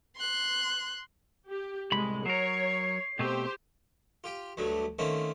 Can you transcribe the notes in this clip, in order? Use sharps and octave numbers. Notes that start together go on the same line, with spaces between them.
C6 F#6
G4
C2 A2 G#3 B5
F#3 A#4 C#5 C7
B2 A3 C4 G4 C5
F4 G4 G5
D2 G2 D3 F#3 A3
D#3 A3 A#3 C4 C#4